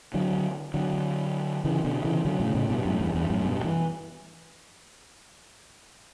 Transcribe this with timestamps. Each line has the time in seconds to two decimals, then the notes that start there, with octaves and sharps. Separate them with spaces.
0.14 D3 F#3
0.74 D3 F#3
1.64 C#3 E3
1.84 B2 D3
2.04 C#3 E3
2.25 D3 F#3
2.40 A2 C#3
2.54 A2 C#3
2.70 G2 B2
2.85 F#2 A2
3.00 E2 G2
3.15 E2 G2
3.30 F#2 A2
3.45 G2 B2
3.64 E3